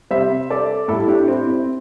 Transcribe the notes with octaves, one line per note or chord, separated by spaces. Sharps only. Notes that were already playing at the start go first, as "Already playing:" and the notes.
C3 G3 C5 E5
A4 D5
A2 G3 E4 A4
E4
D4 G4
C4 E4
C4